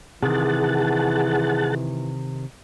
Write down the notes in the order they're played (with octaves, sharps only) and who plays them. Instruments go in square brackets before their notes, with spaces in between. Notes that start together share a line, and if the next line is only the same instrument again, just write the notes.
[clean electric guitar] C3 D#3 [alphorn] E3 [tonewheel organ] G#4 F#5 A5